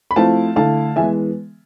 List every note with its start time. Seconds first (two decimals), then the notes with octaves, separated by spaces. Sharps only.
0.11 B5
0.16 F3 A3 C4 E4 F5 A5
0.56 D3 A3 E4 F5 A5
0.96 E3 G#3 B3 E5 G#5